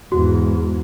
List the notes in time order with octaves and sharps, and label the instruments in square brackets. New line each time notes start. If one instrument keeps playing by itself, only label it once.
[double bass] E2 G#2 [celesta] F#4